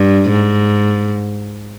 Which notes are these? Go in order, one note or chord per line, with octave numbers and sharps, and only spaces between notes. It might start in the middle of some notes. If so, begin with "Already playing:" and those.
Already playing: G2
G#2